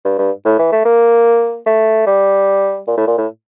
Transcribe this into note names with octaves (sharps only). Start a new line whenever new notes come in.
G2
G2
A2
E3
A3
A#3
A3
G3
A#2
A2
A#2
A2